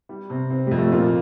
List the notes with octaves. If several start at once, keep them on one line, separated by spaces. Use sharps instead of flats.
G3
C3
C4
F2 G3
A3
A#2 A#3 F4